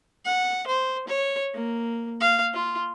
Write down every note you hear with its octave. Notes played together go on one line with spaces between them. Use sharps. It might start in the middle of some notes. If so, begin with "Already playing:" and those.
F#5
C5
C#5
A#3
F5
F4